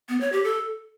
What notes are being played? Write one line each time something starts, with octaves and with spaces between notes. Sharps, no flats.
B3
C#5
G4
A4